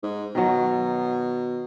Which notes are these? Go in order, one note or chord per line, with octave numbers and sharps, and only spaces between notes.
G#2
B2 D#3 F#3